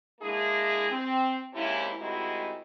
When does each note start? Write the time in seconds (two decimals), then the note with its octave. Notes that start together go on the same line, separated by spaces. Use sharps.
0.21 G#3 A#3 D4 E4 G#4
0.90 C4
1.54 G#2 C3 A#3 C#4 E4
1.99 A2 C3 D#3 G#3 E4 F#4